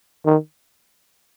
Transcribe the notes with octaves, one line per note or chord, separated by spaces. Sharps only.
D#3